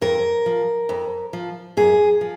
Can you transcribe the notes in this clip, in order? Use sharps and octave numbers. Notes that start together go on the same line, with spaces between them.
F2 A#4
F3
F2
F3
F#2 G#4
F3